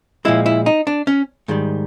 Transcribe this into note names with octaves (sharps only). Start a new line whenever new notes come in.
A#2 F3 G#3 E4
E4
D#4
D4
C#4
G#2 D#3 G3